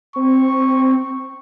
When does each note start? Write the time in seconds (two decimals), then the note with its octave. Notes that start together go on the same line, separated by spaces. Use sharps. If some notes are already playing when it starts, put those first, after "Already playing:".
0.16 C4 C#6